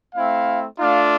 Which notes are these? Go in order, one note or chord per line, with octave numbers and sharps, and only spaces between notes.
A3 C4 E4 F5
A3 D4 F4 F5